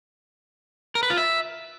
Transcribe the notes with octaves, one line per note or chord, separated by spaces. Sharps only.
A#4
B4
F4
E5